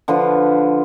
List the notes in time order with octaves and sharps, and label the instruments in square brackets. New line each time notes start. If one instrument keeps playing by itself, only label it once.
[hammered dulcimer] D3 F3 F4 B4